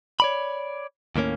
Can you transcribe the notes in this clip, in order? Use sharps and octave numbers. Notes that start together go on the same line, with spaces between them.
C#5 D5 B5
D#2 A2 A#3 C#4